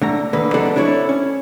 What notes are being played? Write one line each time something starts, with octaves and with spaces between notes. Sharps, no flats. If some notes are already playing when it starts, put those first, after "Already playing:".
D3 A3 A#5
D#2 D3 A#3 B4
F#3 G#3 A3 D4 A4 F#5
D4 E4 A4 B4 C#5
C#4